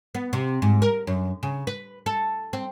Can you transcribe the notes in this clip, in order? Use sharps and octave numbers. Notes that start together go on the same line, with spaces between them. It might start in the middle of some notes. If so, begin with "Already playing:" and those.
B3
C3
G#2
A#4
F#2
C#3
B4
A4
C4